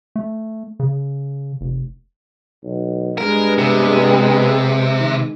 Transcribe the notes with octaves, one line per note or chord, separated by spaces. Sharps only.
A3
C#3
F1
B1
G2 G#3 B3 A#4
C3
D#3